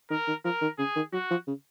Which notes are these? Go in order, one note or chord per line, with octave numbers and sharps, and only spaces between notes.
D#3 A#4
D#3
F3 A#4
D#3
C#3 G#4
D#3
F#3 F#4
F3
C#3